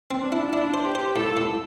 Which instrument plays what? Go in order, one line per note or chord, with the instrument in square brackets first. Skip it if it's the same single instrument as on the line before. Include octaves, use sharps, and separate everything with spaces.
[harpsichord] C4
[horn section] D4
[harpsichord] E4
[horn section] D4 [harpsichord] E4
[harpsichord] C5
[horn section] G4
[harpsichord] C5
[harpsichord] A2 [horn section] A4
[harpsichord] A2